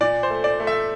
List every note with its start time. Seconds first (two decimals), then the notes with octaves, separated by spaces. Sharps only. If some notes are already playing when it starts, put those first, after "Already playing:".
0.01 A#2 D5
0.23 C5
0.30 A3
0.44 D5
0.60 A3
0.67 E5